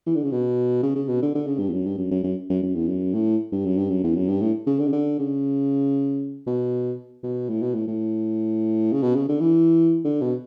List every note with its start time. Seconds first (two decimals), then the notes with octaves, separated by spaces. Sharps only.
0.07 E3
0.15 D3
0.24 C#3
0.32 B2
0.83 C#3
0.95 C#3
1.09 B2
1.22 D3
1.35 D3
1.47 C#3
1.59 G2
1.69 E2
1.73 F#2
1.86 G2
1.98 F#2
2.11 F#2
2.23 F#2
2.50 F#2
2.62 F#2
2.75 E2
2.88 F#2
3.13 A2
3.52 G2
3.65 F#2
3.78 G2
3.90 F#2
4.04 E2
4.15 F#2
4.28 G2
4.41 A2
4.67 C#3
4.80 D3
4.88 C#3
4.92 D3
5.19 C#3
6.47 B2
7.23 B2
7.49 A2
7.62 B2
7.75 A2
7.88 A2
8.93 C#3
9.03 B2
9.15 C#3
9.29 D3
9.40 E3
10.05 D3
10.22 B2